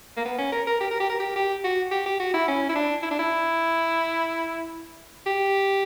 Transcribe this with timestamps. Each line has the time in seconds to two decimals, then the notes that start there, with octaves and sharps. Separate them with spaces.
0.17 A#3
0.25 B3
0.38 C#4
0.52 A#4
0.67 A#4
0.81 G4
0.91 A#4
1.00 G4
1.09 A#4
1.19 G4
1.36 G4
1.64 F#4
1.91 G4
2.06 G4
2.20 F#4
2.34 E4
2.48 C#4
2.69 E4
2.75 D4
3.03 E4
3.11 D4
3.19 E4
5.26 G4